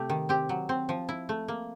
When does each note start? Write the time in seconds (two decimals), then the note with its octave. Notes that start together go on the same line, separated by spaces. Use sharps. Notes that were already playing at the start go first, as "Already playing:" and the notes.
Already playing: C3 A3 G4
0.10 D#3
0.29 C4 G4
0.49 F#3
0.69 C4
0.89 F3
1.09 E4
1.29 A3
1.48 A#3